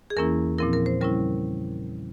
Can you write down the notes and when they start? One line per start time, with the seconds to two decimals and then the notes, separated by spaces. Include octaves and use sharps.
0.10 G#4
0.17 E2 E3 A#3 C#4 E4 A#4
0.58 A#2 F3 C4 E4 A#4
0.73 A#4
0.86 C5
1.01 C#3 G3 C#4 E4 A#4